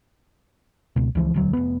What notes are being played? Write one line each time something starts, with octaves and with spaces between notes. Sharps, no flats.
C#2 B2
C#2 E3 F3
E1 D2 F#3
F1 B3